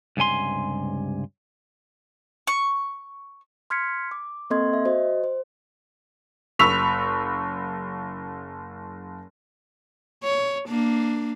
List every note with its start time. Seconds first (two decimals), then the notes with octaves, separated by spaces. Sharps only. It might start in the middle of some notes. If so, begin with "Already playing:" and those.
0.17 C#2 G2 C3 G#5 C6
2.47 C#6
3.70 C6 F6 G#6 B6 C#7
4.11 D6
4.50 A#3 C4 A4 D#5 C6 G#6
4.73 E5
4.85 F#4 C5 D#5
5.24 C5
6.59 F#1 B5 C#6 E6 B6 F7
10.24 C#5
10.68 A#3 D4